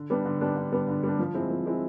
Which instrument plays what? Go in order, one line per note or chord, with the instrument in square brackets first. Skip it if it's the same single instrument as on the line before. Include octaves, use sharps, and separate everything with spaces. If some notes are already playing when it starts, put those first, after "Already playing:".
Already playing: [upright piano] D3
G3 B3 D4
D3
G3 B3 D4
D3
G3 B3 D4
D3
G3 B3 D4
F3
G#3 C4 E4
F3
G#3 C4 E4